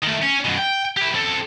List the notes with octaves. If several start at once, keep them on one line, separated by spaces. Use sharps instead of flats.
D#3 A3
C#4
F#2 B2
G5
E4 G4
C4 A4